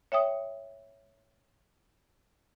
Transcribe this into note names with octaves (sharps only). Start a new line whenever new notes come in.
C#5 E5 G5 D#6